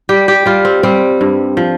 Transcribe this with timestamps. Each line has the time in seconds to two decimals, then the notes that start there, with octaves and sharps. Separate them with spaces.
0.09 G3 G4
0.28 G4
0.46 G3 F4
0.65 C4
0.83 G3 C4
1.21 G2
1.57 F3